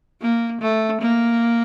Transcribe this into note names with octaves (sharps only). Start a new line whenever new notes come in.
A#3
A3
A#3